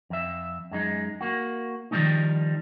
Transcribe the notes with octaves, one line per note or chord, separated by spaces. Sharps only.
F2 E5
F#2 G#3 D#4
A#3 F#4
D#3 F3 G3 A3 C#4 D#4